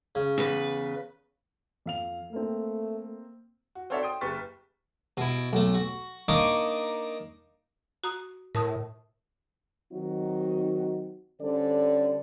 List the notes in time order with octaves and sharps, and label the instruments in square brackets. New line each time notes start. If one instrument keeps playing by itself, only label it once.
[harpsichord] C#3
[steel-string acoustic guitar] E2 B4
[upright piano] F2 F5 F7
[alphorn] A3 [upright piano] A#3 C4
[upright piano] F#4
C4 F#4 A4 C#5 D5 E5
G5 C6 D#6
F#1 G4 B4 C#6 A6 B6
[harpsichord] B2 E4
B1 A3
F#4
A#3 D4 D#4 D#5 C#6 D6
[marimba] F#4 A#5 D#6
[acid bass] A2 [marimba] A#4 A5 D#6
[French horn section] D#3 F#3 C4 D#4 F#4
D3 G3 C#4 A4 C5 D5